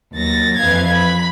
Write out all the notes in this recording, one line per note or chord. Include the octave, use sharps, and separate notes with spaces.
D#2 F#3 A6 A#6
F2 E3 B4 F5 G#6
B5